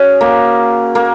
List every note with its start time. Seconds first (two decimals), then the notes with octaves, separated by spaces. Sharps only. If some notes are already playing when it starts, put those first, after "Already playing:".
Already playing: C#4 F#4 G#4
0.21 A#3
0.95 A#3